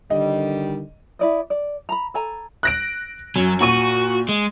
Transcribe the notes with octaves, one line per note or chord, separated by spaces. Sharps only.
D3 D#3 G3 D#5
E4 D5 D#5
D5
A#5 B5
A4 G#5 A#5
F#6 A#6 D7
F#2 F#3
A#2 F#4 C#6 D#7
G#3